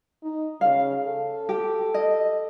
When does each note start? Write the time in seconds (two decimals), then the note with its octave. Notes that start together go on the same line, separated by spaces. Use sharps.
0.23 D#4
0.61 C#3 F5
1.06 A4
1.49 G4
1.94 D#5